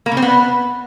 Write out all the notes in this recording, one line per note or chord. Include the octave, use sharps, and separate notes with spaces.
A#3
C#3
C4
B3